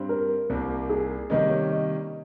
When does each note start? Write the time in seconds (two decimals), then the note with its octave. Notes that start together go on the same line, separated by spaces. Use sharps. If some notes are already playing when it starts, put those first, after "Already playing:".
Already playing: G2 G3 C4
0.09 A#4
0.50 C2 C3 G3 A#3
0.90 G#4
1.30 C3 D#3 G3 A#3 C#4 D#5
1.50 C#5
1.70 D#5